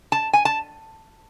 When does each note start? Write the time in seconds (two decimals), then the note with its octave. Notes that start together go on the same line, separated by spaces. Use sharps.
0.12 A5
0.33 G#5
0.45 A5